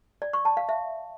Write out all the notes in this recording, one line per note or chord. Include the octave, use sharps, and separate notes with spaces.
D5
C#6
A5
F5
E5